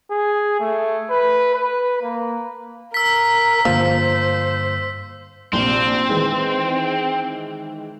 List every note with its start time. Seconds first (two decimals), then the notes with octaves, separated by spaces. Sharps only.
0.11 G#4
0.60 A3
1.11 B4
1.54 B4
2.02 A#3
2.94 A#4 E6 B6
3.65 G2 D3 F3 A#3 C5 E6
5.53 A#1 C3 C4
6.09 D#3 E3 G#3